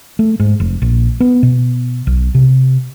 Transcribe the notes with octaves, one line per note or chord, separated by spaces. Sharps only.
A3
G#2
F1
A#1
B3
B2
B1
C3